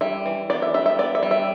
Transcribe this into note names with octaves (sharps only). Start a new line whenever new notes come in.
G3 E5
E3
B3 D5
E5
G3 E5
E5
B3 D5
E5
G3
E5